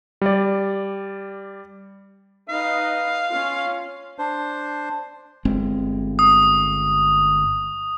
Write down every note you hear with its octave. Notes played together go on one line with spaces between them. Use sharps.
G3 D5
D#4 B4 D#5 F5
C#4 F4
D4 C5
G1 G#3 C4
D#6